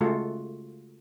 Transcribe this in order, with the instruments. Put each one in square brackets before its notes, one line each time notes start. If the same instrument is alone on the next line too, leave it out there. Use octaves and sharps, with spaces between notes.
[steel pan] C#3 G#3 A3 F4 F#4 A4